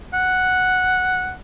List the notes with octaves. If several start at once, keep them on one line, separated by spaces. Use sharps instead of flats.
F#5